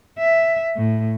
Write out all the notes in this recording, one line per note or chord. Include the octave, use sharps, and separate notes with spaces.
E5
A2